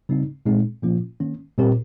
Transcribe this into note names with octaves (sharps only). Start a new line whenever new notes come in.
C#3 G3 C4 D#4
A#2 G#3 C4 D#4 G#4
A#2 F3 A#3 C#4 F4
D#3 A#3 C#4
A#2 G3 C4 G4 A#4